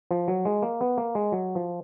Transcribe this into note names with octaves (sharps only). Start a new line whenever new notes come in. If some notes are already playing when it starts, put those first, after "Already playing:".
F3
F#3
G#3
A#3
B3
A#3
G#3
F#3
F3